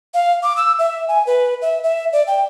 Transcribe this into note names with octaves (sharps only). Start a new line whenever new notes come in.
F5
D6
E6
E5
G#5
B4
E5
E5
D5
G5